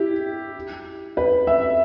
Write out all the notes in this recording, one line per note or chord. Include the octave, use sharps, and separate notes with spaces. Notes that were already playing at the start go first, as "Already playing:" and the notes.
Already playing: E4 G4
B4
E5